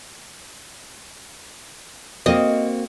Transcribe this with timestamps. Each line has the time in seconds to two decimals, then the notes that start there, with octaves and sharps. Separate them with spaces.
2.26 A#3 C4 F#4 D#5